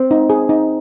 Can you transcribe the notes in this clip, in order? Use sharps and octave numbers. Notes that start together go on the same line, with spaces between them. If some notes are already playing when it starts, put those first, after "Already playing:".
Already playing: C4
D#4
G#4
D#4